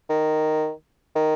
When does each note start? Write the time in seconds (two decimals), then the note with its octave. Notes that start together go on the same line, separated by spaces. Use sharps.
0.09 D#3
1.15 D#3